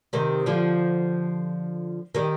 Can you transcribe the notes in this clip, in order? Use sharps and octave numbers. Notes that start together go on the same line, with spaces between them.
C3 D#3
D3 F3
D#3 G3